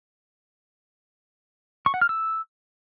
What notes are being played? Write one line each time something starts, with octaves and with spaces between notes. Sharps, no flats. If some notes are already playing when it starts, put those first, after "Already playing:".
C#6
F#5
F6
E6